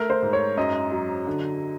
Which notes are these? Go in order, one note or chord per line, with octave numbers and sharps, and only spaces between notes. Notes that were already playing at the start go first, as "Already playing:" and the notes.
Already playing: A3 A#4
C5
G#2
C#5
F#2 D#5
F#3
D3